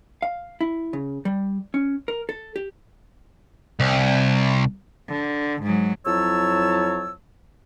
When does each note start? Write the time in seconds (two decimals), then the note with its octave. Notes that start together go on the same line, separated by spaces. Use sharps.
0.22 F5
0.61 E4
0.93 C#3
1.25 G3
1.74 C#4
2.08 A#4
2.29 A4
2.56 G4
3.80 C2
5.08 D3
5.62 G#2 F#3
6.05 F2 F#3 E4 C#5 A5 E6